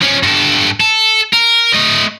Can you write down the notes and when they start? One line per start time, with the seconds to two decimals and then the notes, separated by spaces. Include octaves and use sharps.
0.01 F3 C#4
0.23 G2 A4
0.80 A4
1.33 A#4
1.74 A3 D#5